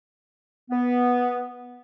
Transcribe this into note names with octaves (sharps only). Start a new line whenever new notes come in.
B3